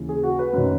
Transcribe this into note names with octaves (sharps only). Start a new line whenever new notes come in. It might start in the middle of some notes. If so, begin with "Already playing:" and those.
Already playing: D#2 C#3 E3
G#4
F#4
B4
F#2 D#3